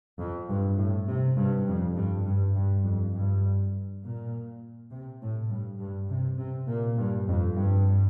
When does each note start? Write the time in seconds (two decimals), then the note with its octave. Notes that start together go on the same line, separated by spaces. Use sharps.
0.20 F2
0.49 G2
0.79 A2
1.09 C3
1.38 G2
1.67 F2
1.96 G2
2.26 G2
2.56 G2
2.85 F2
3.15 G2
4.03 A#2
4.91 C3
5.21 A2
5.50 G2
5.80 G2
6.09 C3
6.39 C3
6.68 A#2
6.97 G2
7.27 F2
7.56 G2